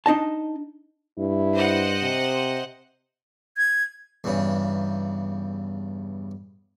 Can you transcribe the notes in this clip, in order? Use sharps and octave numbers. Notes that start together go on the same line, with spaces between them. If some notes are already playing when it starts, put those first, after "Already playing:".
D4 D#4 D#5 A5
G2 E4
C5 D#5 F#5
C3
G#6
E2 G2 C#3